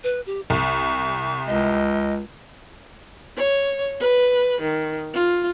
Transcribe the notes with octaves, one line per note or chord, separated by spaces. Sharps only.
B4
G4
C2 C#6
C#2 D#5
C#5
B4
D#3
F4